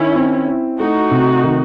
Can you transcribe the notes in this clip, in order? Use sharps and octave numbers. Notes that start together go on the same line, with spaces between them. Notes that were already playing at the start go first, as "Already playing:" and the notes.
Already playing: D#3 C#4 E4
C4
E4
A3 D#4 F#4
C3
D#3